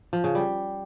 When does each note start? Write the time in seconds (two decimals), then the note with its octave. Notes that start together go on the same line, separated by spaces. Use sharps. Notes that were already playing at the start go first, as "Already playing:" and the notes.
0.13 F3
0.24 C#3
0.35 G3